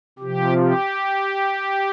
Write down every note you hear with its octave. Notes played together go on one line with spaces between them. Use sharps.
C3 F3 G4
G4